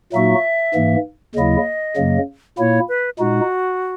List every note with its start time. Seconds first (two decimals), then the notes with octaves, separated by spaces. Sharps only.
0.13 A#2 F#3 A#3 D#4 F#4 E5
0.74 G#2 E3 A#3
1.35 D#2 C#3 F#3 A#3 E4 D#5
1.97 F#2 C#3 F#3 A#3
2.58 A#2 A#3 E4 C#5
2.88 B4
3.19 A#2 G#3 D#4 F#4